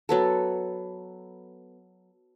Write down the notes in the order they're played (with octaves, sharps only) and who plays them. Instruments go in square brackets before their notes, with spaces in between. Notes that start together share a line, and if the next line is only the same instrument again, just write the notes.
[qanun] F#3 B3 A4